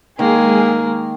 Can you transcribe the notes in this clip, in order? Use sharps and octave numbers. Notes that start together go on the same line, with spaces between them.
D#3 G#3 A#3 G#4